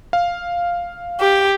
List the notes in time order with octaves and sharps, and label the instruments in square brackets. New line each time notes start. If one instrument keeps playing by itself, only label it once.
[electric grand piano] F5
[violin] G4